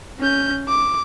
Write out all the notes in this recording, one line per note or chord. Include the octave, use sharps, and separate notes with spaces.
C#4 G6
D6